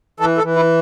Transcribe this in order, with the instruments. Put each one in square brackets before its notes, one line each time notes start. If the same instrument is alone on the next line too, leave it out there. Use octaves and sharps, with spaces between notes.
[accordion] E3 A4
A4
E3
E4